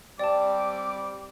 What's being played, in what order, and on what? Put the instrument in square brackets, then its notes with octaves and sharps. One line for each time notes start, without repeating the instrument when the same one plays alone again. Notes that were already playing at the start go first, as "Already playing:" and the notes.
[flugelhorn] G3 [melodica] C4 [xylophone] D5 A5 [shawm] D6